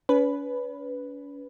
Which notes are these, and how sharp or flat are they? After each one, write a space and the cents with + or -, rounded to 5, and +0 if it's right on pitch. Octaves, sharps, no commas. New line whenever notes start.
C#4 +40 B4 +0